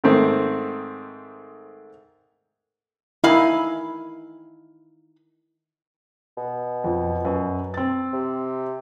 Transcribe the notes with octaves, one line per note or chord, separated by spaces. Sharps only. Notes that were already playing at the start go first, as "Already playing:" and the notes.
G#2 D#3 A3 C4
D#3 E4 F5 G#5 B5
B2
F2 F3
F#2 B4
C4 A6
C3